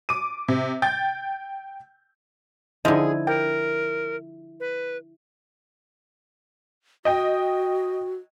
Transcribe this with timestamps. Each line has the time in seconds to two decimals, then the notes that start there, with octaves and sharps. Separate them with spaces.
0.09 D6 D#7
0.48 C3
0.82 G5 G6 A6
2.85 D3 F3 D#4 E4 G#4 D#5 G#6 D#7
3.27 A#4 G5
4.60 B4
7.05 F#4 D#5 G5